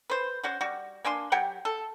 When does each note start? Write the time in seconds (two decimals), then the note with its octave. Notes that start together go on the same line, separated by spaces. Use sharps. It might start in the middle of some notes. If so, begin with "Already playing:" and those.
0.10 B4 C5
0.43 C#4 F#4 C5
0.61 G3 F#4
1.04 A#3 D4 G#5 C6
1.32 F#3 G4 F#5 G5
1.65 A4